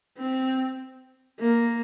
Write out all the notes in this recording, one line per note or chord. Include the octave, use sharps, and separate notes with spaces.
C4
A#3